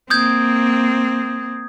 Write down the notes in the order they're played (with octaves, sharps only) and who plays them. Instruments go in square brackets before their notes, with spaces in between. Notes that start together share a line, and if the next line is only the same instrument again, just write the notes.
[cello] A#3 C4 [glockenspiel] D#6 G6 G#6